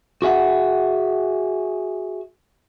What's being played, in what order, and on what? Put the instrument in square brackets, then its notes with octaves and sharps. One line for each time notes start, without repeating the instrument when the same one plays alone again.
[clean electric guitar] F#4 G#4 E5 F#5